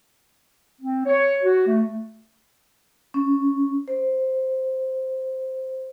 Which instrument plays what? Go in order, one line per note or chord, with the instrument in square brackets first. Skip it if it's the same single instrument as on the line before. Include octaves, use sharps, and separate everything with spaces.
[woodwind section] C4
C#5
F#4
A3
[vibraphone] C#4
C5